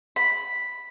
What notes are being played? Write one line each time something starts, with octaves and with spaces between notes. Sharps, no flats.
B5